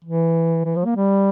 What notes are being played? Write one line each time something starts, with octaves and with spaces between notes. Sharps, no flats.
E3
E3
F3
A#3
G3